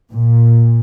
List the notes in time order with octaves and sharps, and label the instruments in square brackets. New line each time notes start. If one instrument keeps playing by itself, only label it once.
[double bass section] A#2